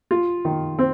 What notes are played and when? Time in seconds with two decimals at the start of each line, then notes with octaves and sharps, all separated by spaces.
0.11 F4
0.45 D#3
0.79 C4